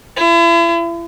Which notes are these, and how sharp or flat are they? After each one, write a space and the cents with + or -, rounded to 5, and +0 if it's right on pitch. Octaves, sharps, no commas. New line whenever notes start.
E4 +40